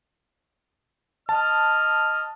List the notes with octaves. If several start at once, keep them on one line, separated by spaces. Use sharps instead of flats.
D#5 A5 F6